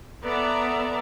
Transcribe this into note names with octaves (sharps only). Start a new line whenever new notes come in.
B3 A4 D5 E5 A#5